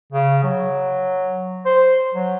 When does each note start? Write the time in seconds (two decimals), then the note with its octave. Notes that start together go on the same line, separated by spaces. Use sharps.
0.12 C#3
0.43 F#3
1.65 C5
2.14 F#3